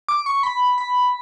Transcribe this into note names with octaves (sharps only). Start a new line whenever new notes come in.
D6
C#6
B5
B5